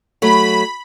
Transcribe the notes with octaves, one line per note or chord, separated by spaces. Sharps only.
F#3 A3 B5